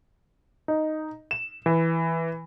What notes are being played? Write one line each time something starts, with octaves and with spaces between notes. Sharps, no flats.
D#4
E7
E3